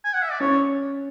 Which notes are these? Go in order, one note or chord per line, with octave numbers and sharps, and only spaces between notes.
G#5
F#5
E5
D5
C#4 C#5